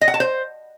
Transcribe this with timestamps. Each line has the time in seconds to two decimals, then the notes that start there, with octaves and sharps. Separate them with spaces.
0.01 D#5
0.08 F#5
0.14 A5
0.20 C5